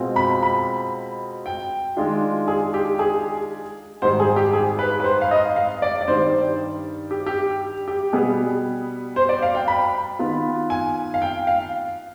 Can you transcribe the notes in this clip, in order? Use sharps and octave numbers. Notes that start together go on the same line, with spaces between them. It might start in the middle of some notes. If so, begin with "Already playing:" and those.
Already playing: B2 G#3 C4 F4
B5
B5
G5
D#3 G#3 D4 F4
G#4
G4
G#4
G#2 D#3 G3 C5
G#4
G4
G#4
B4
B4
C5
F5
D#5
F5
D5
D5
G2 D#3 G3 C5
G4
G4
G4
B2 G3 B3 G#4
C5
D5
F5
G5
B5
D#3 B3 F4
G#5
F5
G5
F5